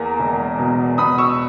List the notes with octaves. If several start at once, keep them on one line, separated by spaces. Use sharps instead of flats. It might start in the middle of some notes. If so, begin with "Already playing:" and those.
Already playing: E2 A#3 A#5
E1
B2
B2 B5 D#6
C#6 E6